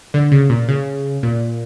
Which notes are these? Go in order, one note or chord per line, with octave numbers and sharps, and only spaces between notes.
D3
C#3
A#2
C#3
A#2